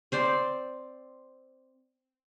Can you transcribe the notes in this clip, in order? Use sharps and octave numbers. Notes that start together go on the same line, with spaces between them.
C4 C5 D5